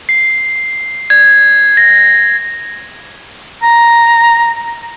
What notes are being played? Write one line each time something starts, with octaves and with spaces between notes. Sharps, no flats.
C7
G#6
A#6
A#5